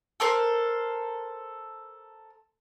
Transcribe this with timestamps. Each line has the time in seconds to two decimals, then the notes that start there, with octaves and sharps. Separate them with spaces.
0.20 A4 A#4 C5